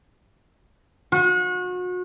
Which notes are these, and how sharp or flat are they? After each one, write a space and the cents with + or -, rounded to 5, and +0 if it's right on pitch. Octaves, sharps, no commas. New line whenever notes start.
F#4 -35